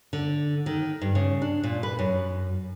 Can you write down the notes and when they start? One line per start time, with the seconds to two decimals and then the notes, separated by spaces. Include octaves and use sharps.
0.13 D3
0.66 D#3
1.01 G2
1.15 C#3
1.42 D4
1.63 A#2
1.83 B4
1.99 F#2